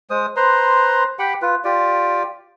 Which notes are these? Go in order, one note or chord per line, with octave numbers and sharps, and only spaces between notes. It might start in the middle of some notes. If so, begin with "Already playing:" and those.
G#3 C5 D#6
B4 C5 A#5 C6
G4 F#5 G5 B5
F4 B4
F4 G4 D5